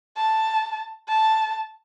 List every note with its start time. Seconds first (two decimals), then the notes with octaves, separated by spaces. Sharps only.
0.16 A5
1.08 A5